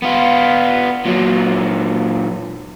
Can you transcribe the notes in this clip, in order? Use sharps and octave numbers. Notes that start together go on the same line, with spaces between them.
B3 F4
A#2 F#3